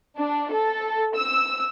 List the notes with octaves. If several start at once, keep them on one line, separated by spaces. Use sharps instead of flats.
D4
A4
E6